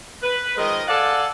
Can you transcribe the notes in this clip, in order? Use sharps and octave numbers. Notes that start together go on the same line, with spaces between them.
B4
D#3 F3 G#3 A#4 D#5
A4 D5 F5 F#5 G#5 A5